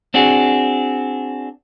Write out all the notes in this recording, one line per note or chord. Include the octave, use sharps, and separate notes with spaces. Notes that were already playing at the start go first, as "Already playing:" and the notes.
C4 D4 F#4 G#4